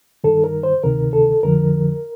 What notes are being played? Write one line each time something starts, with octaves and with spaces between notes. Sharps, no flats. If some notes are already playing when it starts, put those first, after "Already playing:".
G2 D#3 A4
A#4
C5
D2 C3 D#3 A#4
A4
F2 D3 F3 A#4